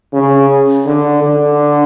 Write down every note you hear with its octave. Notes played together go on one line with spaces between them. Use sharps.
C#3
D3
D3